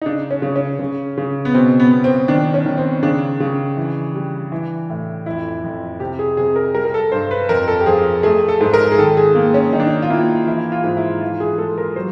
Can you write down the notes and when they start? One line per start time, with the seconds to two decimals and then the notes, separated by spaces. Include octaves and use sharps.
0.01 D#4
0.06 C#3 D4
0.31 C#4
0.42 C#3
0.56 C#4
0.79 C#3
1.18 C#3
1.45 B3
1.54 B2 C4
1.80 B3
1.91 B3
2.04 C4
2.28 D#3 D4
2.54 C#4
2.66 D#3
2.78 C4
3.03 C#3 D4
3.40 C#3
3.77 E3
4.15 G3
4.52 E3
4.90 A2
5.26 F2 E4
5.64 F2
6.00 C3 G4
6.19 G#4
6.37 C3 G#4
6.56 A#4
6.74 G3 A#4
6.85 A#4
6.94 A4
7.12 G2 C5
7.31 B4
7.49 F2 A#4
7.68 A4
7.80 G4
7.86 F3 G#4
8.23 A3 G#4
8.49 A4
8.61 G#2
8.74 A#4
8.92 G#4
8.99 D#3 A4
9.17 G#4
9.35 A#3
9.54 C#4
9.73 D#3 D#4
9.80 D4
9.87 D#4
10.02 F4
10.10 A#3 E4
10.47 E3 E4
10.72 F4
10.84 G#2
10.97 E4
11.21 E3 F4
11.40 G#4
11.58 G#3 A4
11.78 A#4
11.96 F#3 C5